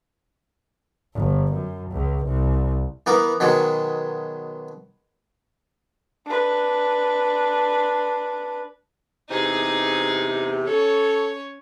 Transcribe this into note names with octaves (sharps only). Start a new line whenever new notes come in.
G1
F#2
C#2
C2
E3 B3 A#4
B2 D#3 F#3 G#3
D4 B4
E2 C3 D#4 G#4
C#4 A4 C#5